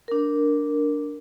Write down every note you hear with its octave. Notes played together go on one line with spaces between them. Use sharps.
D4 A#4